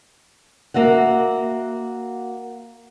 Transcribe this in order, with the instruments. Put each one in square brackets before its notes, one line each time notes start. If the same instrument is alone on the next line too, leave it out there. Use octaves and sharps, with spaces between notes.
[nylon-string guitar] A#3 F#4 E5 F#5